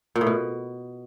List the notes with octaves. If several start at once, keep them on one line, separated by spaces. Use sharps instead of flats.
A#2
A2
B2